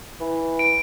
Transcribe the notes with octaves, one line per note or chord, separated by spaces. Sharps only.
E3
D7